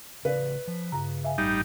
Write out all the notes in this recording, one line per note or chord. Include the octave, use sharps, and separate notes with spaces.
A1 C#3 B4 D5 F5
F3
G2 C#3 A#5
E5 F5 G#5
A1 G3 D#4